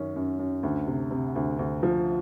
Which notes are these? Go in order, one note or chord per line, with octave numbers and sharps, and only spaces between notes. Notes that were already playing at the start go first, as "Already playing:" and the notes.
Already playing: F#2 D#3 C#4
F#2
F#2
D2
C3
C3
D2
D2
F3